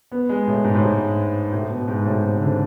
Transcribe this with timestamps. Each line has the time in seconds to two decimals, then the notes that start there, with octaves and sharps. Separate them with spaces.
0.12 B3
0.29 G#3
0.47 A2
0.64 G#2
0.75 A2
0.82 G#2
1.53 A2
1.70 B2
1.88 G#2
2.05 A2
2.23 C3
2.40 D3